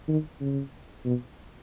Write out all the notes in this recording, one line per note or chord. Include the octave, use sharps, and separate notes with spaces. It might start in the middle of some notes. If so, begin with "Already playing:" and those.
D#3
C#3
B2